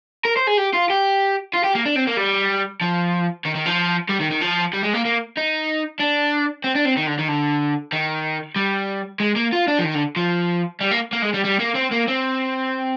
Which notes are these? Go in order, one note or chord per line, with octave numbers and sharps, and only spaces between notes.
A#4
C5
G#4
G4
F4
G4
F4
G4
A#3
D4
C4
A#3
G3
F3
D#3
D#3
F3
G3
D#3
D#3
F3
G3
G#3
A#3
A#3
D#4
D4
C4
D4
C4
D#3
D3
D#3
D3
D#3
G3
G#3
A#3
F4
D4
F3
D#3
D3
F3
G3
A#3
A#3
G#3
G3
G3
A#3
C4
A#3
C4